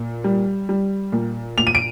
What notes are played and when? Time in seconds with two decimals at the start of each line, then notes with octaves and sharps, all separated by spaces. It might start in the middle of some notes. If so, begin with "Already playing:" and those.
Already playing: A#2
0.24 G3
0.69 G3
1.12 A#2
1.57 A#2 F7
1.67 D#7
1.75 D7